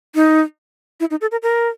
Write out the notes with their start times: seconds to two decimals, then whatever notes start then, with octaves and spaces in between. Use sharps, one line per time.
0.15 D#4
1.00 E4
1.11 D#4
1.21 A4
1.31 A#4
1.43 A#4